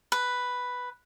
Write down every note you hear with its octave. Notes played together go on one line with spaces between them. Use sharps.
B4